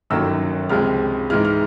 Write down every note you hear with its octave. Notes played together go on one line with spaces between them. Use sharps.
G1 F#2 D#3 F#3 A#3 E6
C#2 C3 F3 G#3 F6
G#2 E3 G#3 F6
F6